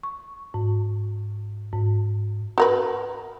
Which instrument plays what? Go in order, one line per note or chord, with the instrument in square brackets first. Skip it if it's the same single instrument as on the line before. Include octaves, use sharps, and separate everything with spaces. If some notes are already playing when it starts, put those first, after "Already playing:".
[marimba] C#6
G#2
G#2
[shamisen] F#4 A#4 B4